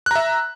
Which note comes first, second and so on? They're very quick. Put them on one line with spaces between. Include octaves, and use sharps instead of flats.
F#6 A#5 E5